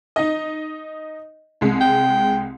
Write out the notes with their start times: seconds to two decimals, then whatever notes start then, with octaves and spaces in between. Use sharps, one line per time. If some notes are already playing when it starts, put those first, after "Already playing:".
0.16 D#4 D#5
1.61 C2 G#3
1.81 G5